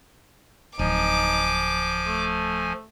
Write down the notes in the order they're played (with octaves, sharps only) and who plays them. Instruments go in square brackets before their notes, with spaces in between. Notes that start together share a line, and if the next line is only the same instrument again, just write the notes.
[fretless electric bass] D1 [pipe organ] F3 G#5 [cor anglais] D#4 [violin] D6
[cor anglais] A3